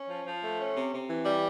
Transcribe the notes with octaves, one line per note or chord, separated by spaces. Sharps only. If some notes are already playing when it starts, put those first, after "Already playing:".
Already playing: C#4
F3
F3
A3
C#4
C3
C3
E3
G3